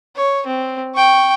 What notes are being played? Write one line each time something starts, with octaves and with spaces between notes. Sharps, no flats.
C#5
C4
G5 C#6